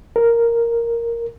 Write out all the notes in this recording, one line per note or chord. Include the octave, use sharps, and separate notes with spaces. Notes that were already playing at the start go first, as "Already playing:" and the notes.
A#4